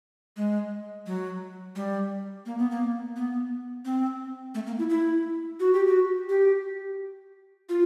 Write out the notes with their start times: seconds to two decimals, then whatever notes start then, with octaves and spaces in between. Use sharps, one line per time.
0.37 G#3
1.06 F#3
1.76 G3
2.46 A#3
2.58 B3
2.71 A#3
3.16 B3
3.85 C4
4.54 A3
4.67 A#3
4.78 E4
4.89 E4
5.60 F#4
5.73 G4
5.87 F#4
6.29 G4
7.69 F4